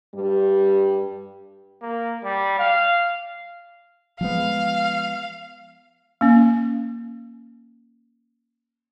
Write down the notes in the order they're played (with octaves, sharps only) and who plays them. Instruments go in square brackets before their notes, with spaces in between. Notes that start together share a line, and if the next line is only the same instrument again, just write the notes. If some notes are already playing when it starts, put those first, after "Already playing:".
[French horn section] G2 G3
[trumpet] A#3
G3
F5
[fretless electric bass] F3 G#3 B3 [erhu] F5
[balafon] A#3 C#4